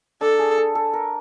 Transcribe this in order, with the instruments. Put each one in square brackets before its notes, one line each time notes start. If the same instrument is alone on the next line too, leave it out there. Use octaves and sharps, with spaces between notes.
[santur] D4 [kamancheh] A4
[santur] G#4
A4
A4
A#4